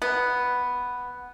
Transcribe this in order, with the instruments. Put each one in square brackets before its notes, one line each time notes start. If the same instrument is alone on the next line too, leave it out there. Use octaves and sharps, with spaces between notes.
[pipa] B3